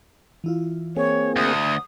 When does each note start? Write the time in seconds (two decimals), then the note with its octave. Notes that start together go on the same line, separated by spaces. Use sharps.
0.44 E3 E4 F4
0.97 A#3 C4 G#4 C#5
1.36 D2 D#6